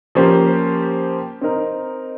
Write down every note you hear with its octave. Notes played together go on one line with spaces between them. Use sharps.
F3 A#3 C#4 G4 C5
C4 D#4 A#4